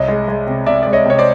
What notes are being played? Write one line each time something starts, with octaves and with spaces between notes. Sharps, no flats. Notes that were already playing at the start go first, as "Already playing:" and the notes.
Already playing: C2 C#5 D#5
G#3
G#3
C3
C3 D5 E5
G#3 D5
C#5 D#5
C3 C#5
C5 D5